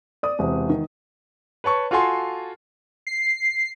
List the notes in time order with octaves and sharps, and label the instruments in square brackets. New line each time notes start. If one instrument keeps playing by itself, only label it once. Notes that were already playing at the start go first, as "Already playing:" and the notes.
[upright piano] D5 D#6
E1 C3
D#3
[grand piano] B4 C#5 A5 C#6
F4 F#4 A4 G#5 A5 C6
[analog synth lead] C7